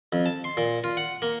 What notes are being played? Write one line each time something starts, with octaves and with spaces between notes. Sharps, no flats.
F2
A5
C6
A#2
F4
F#5
A#3